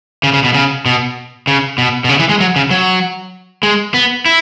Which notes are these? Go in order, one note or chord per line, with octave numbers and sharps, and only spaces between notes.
C#3
C#3
B2
C#3
B2
C#3
B2
B2
C#3
E3
G#3
F#3
C#3
F#3
G#3
B3
E4